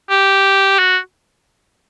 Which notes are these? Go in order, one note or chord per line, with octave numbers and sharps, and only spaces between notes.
G4
F#4